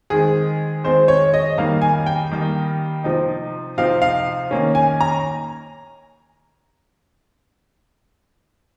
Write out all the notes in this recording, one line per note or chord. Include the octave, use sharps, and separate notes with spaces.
D#3 G#3 C4 G#4
D#3 G#3 C4 C5
C#5
D#5
D#3 G3 A#3 D#4 F5
G#5
G5
D#3 G3 A#3 D#4
C3 F3 C4 D#4
C3 F3 C4 D#4 F5
F5
D#3 A#3 C#4
G#5
A#5